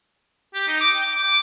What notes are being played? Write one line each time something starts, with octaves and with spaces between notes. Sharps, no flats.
G4
D#4
D6
G5
D6
D6